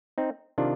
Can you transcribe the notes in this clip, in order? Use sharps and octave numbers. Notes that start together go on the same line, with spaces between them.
C4 D#4
C3 D#3 D4 F4